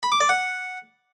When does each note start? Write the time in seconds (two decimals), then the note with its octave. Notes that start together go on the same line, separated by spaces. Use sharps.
0.03 B5
0.12 D6
0.20 D5
0.29 F#5